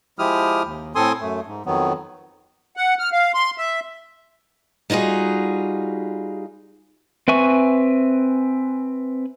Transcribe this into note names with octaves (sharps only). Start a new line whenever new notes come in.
F3 G#3 E4 G4 D#6 F6
D#2
A2 C4 A4 G#5 C6 D#6
F#2 A3
G#2
F2 D#3 F#3 B3
F#5
F6
F5
C6
E5
G3 D#4 F4 F#4 G#4
C4 B4 E5 G#5 C#6